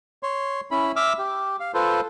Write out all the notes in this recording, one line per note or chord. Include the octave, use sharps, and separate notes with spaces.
C#5 C6
C#4 E4 B5
E5 D6 E6 F6
G4
F5
F4 A4 B4 C5